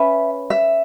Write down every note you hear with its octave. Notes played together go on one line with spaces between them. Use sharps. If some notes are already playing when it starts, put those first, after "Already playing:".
Already playing: C#4 B4 E5
E5